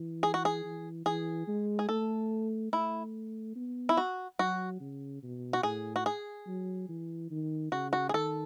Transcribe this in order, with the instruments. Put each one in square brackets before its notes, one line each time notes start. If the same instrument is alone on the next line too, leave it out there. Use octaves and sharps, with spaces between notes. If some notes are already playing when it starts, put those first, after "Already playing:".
Already playing: [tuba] E3
[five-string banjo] G#4
F#4
G#4
[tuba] E3
[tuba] E3 [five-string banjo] G#4
[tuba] G#3
[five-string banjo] G#4
[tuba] A3 [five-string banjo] A4
[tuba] A3 [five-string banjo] E4
[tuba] B3
[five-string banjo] E4
F#4
[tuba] F#3 [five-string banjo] F#4
[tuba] C#3
B2
[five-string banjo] F#4
[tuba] A2 [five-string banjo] G#4
[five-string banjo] F#4
G#4
[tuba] F#3
E3
D#3
[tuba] C#3 [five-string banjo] F#4
[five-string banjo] F#4
G#4
[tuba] D#3 [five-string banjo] A4